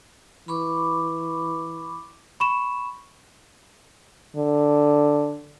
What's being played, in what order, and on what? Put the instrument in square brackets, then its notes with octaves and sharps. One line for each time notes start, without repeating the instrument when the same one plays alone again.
[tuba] E3 [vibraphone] B5 C#6 D6
[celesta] B5 C#6 E7
[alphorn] D3